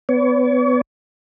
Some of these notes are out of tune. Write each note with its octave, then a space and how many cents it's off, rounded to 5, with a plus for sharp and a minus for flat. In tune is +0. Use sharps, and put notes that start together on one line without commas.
B3 +25 C#5 +40